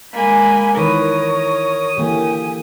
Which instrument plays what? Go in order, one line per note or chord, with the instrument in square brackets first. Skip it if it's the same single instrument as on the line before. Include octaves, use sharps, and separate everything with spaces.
[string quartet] G#3 A#3 [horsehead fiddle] G#5 B5
[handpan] D#3 E3 B4 [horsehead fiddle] A#4 [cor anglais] C#5 [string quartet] D#6
[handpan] D3 E3 A#3 [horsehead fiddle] G4 G#5